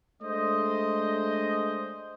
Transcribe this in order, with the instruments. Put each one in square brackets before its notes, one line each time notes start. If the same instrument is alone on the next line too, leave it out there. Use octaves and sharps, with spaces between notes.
[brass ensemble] G#3 A3 D4 C5 D#5